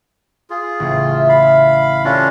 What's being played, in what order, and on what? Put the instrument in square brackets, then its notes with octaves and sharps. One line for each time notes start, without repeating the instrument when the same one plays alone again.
[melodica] F4 G#4
[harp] A1 C#3
E5
[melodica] F5 B5
[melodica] C#4 D4 F4 [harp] G4 A4 A#4